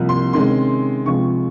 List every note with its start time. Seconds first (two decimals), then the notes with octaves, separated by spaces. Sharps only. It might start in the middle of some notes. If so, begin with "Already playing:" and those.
Already playing: C2 C3 F3 A#3
0.09 C6
0.33 C3 D#3 G#3 C#4 C6
1.06 C#2 C3 F3 G#3 C#6